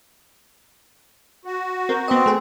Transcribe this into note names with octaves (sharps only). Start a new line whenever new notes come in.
F#4
C4 A#4
B3 C4 D#5
A3 G#4